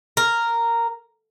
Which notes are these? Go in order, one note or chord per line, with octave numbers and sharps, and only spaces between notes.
A#4